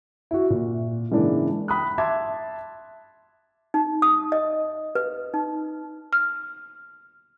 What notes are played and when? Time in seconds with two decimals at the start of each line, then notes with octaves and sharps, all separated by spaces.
0.31 E4 F#4
0.50 A#2
1.12 G#2 C#3 E3 A#3 D4 E4
1.68 G5 B5 D#6 F#6
1.98 E5 A5 C6 D6 G#6
3.74 D#4
4.02 D#6
4.32 D#5
4.95 B4
5.34 D#4
6.13 F6